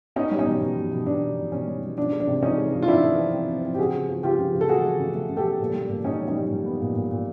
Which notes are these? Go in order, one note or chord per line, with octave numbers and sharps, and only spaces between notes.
B3 C#4 D#4
G3
C#4 D#4
B2
B2
B2
B2
B2 D4
B2
B2
B2 C#4
G3
B2
F3 D4
G#3
D4
C3
F3 C#4 D#4
G#3
F3
F4
F3 D4 E4
F3
C4
C4
C4
C4
G4
C#3 F#4 G#4
C#3
F3
C#3 F4 G4
C#3
C#3
A4
A3 F#4 G#4
A3
C#3
A3
C#3
G4 A4
C#3
A#2
G3
A#2
A#2 C#4 D#4
G3
C#4 D#4
G3
A#2
B3
A#2
A#2
A#2